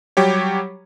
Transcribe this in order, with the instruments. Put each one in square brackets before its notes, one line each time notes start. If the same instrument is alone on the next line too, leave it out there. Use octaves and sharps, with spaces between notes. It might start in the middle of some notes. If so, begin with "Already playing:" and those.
[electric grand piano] F#3 G3 G4 C#5